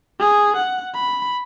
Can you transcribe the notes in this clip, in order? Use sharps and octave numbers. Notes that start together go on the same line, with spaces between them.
G#4
F#5
B5